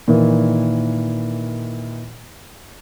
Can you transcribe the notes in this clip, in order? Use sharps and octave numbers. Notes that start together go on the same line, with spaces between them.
A#2 D#3 E3